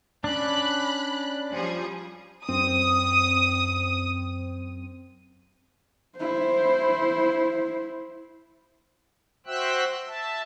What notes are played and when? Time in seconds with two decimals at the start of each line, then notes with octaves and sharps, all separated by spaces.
0.24 C#4 D4 B5 F#6
1.52 F3 G3 G#4
2.48 F#2 C4 D#6 D#7
6.18 E4 C5
9.46 F#4 C5 E5 G5 E6 F#6
10.08 E5 A5